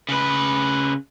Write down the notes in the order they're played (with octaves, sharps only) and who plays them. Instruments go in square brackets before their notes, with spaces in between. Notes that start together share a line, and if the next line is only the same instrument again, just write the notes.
[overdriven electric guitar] C#3 B4